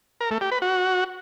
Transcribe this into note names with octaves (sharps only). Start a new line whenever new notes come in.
A#4
A3
G4
B4
F#4